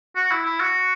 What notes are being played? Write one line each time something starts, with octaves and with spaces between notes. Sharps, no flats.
F#4
E4
E4
F#4